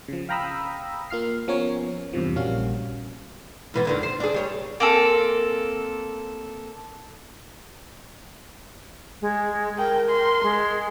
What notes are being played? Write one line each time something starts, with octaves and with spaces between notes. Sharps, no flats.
C#3 F3
F5 G5 A#5 B5 D#6 E6
A#3 F4 F6 C7
F3 B3 C#4 A#4 C#5
E2 G2 C3 F3
A#1 G3 A#3 C#4 F#4 F5
G#2 E3 B3
F2 D3 D#3
C5
D4 G#4
G3 C#5
A#3 C4 A4
G#3
A#4 G5
C6
G#3